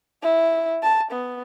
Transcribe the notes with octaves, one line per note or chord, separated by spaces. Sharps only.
E4
A5
B3